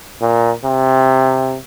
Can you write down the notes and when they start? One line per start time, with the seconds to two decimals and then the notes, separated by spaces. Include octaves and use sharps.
0.21 A#2
0.65 C3